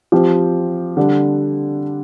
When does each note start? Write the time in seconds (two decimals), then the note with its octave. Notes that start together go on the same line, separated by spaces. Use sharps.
0.12 F3 C4 G4
0.97 D3 G3 D4